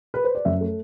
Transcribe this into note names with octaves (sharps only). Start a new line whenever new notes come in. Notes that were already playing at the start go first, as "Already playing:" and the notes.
B4
C5
D5
F#2 E5
A3